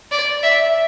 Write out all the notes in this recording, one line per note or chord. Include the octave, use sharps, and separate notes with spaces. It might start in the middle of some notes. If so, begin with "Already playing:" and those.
D5
E5